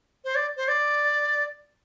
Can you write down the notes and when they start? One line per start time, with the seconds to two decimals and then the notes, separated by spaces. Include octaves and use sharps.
0.24 C5
0.35 D5
0.57 C5
0.68 D5